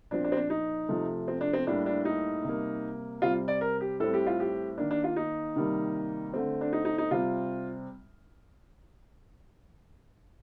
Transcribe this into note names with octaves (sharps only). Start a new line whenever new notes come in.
A#2 F3 C4 D4
D4
C4
D4
D#4
C3 F3 A3
C4
D4
C4
A2 G3 A#3 D4
D4
D#4
C3 G3 A#3
C3 G3 C4 F4
D5
A#4
G4
A2 G3 C4 A4
G4
F4
G4
D#3 A#3 D4
D4
F4
D#4
C3 D#3 G3 A#3
D3 A3 C4
D4
D#4
D#4
D#4
C3 G3 C4 F4